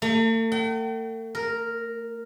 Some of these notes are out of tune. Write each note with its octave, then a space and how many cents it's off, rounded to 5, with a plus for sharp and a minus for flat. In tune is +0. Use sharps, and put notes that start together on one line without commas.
A3 +45
G5 -45
A#4 -5